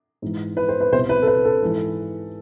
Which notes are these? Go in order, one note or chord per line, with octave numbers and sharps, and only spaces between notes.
G#2 E3
B4
C5
B4
C2 B2 C5
B4
A4
B4
A4
G#2 E3